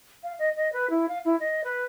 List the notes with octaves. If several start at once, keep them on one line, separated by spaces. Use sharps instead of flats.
F5
D#5
D#5
B4
E4
F5
E4
D#5
B4